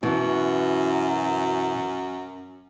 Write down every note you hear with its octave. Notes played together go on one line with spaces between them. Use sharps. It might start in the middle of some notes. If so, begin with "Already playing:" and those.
F#2 B2 E3